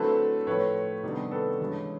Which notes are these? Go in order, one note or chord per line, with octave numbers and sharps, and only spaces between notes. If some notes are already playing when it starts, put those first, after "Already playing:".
Already playing: D3 F#3 A3 C4 E4 A4 B4
A2 F3 A3 B4 C#5
C3 D#3 G3 B3 D4
A4 B4
G2 E3 G#3 C#4 E4